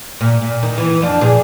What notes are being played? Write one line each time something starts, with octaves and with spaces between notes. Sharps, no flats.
A#2
A#2
D#3
E3
F2 F3 D4
A#2 G#4